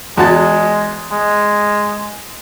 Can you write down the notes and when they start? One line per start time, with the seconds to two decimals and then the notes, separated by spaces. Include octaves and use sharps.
0.17 E2 G#3 F#4 A5
1.12 G#3